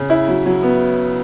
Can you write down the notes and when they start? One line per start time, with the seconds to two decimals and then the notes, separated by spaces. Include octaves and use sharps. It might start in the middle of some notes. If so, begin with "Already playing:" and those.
Already playing: C#3
0.10 E4
0.28 F#3
0.46 F#3
0.63 B3